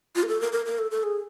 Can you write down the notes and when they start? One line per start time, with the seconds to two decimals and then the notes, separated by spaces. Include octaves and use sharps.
0.16 F4
0.23 A#4
0.28 A4
0.41 A#4
0.53 A#4
0.66 A#4
0.79 A4
0.91 A4
1.03 G#4